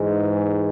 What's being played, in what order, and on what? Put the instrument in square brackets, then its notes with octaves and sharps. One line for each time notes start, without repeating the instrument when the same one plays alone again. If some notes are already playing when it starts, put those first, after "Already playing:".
Already playing: [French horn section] G#2 E3 G#3